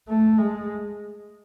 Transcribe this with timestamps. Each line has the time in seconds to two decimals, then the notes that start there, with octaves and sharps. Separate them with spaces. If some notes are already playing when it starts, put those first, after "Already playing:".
0.08 A3
0.38 G#3